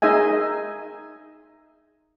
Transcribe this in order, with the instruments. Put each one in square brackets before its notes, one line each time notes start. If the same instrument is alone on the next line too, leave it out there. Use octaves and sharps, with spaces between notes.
[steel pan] D#4 G#4 D#5 E5 G#5